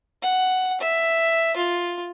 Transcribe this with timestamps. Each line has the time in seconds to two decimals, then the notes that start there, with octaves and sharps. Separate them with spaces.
0.22 F#5
0.81 E5
1.57 F4